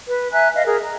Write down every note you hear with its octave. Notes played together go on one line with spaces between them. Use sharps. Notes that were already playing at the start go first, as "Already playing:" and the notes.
B4
E5 G#5 A#5 F#6
D#5 F5
G#4 A#4
A#5